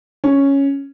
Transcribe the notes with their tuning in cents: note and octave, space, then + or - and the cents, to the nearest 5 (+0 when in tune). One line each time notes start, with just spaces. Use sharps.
C#4 +0